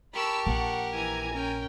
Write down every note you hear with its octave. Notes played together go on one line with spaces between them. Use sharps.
G4 A#4 A5 B5 C#6 E6
A#1 A#2 F#5
E3 G#5 A#5
C#4 A#4 G5